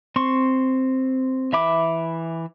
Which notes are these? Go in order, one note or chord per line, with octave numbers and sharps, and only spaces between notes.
C4 C6 C#6
E3 E5 B5 D6